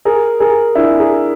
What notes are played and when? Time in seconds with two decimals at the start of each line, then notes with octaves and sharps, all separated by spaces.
0.05 G#4 A#4
0.40 G#4 A#4
0.75 D4 E4
1.00 G#4 A#4